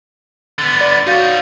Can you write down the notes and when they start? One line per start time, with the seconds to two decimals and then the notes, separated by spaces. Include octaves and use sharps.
0.58 D3 B3 A6
0.81 D5
1.07 D#4 F#4 C#5 F5